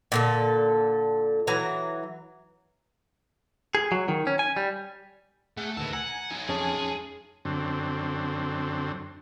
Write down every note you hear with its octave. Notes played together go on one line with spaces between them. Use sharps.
A#2 D3 A4
E3 F#3 A#5
G#4
F#3
D#3
C#4
G#5
G3
A3 G#4 F#5
D2 D#3 B4 A5 E6
F#5 G#5 A#5
F#3 D#4
F2 C#4 G#4 A5
F#2 D3 C4